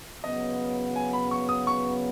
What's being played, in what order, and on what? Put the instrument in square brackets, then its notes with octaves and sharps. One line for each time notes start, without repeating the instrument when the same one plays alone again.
[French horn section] C#3 F#3 B3 [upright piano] D#5
[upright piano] G#5
B5
C#6
D#6
C#6